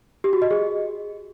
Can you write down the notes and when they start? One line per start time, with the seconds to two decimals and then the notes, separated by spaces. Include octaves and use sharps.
0.24 G4
0.33 F#4
0.42 D#5
0.51 G#4